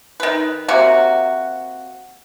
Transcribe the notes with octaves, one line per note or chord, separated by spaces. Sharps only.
D#3 B4
C3 A#3 F#4